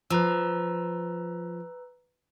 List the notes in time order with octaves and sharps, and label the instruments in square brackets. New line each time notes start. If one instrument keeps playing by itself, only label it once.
[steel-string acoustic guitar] F3 [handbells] B4 A#5 E6